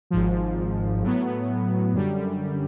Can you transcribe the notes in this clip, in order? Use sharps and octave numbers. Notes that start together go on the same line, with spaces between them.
G#1 G#2 F3
A2 F#3 B3
F#2 D3 G3